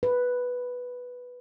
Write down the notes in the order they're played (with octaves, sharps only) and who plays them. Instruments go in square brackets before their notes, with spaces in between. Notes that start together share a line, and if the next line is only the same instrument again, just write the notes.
[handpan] B4